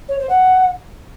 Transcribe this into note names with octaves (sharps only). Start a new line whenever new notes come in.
C#5
C5
F#5